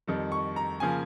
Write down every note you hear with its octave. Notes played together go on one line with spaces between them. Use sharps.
F2 D#3 G3
C#6
A#5
C#3 F3 A#3 G#5